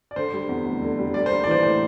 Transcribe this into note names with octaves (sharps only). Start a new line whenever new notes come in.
D5
D3 C5
G3
E2
F1
D3
G3
G3 D5
C5
A#3
D5
E3 C5
A2 C5